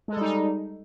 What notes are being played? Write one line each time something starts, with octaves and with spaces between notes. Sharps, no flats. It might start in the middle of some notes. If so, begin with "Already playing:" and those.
G3 G#3 D#4 A4